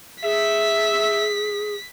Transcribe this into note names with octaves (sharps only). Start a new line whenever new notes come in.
G#4 E5 B6